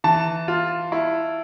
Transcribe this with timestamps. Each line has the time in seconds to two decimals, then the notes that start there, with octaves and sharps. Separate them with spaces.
0.04 E3 A5
0.48 F4
0.92 E4